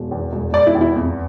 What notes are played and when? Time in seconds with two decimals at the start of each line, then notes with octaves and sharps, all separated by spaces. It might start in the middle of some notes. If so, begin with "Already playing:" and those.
Already playing: E1
0.11 E2
0.33 E1
0.53 E1 D5
0.67 E4
0.75 E2
0.81 E4
0.96 F2